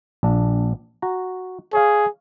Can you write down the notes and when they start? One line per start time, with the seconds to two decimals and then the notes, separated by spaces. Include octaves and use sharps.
0.23 A#1 D4
1.02 F#4 A#5
1.73 G#4 C#5 F5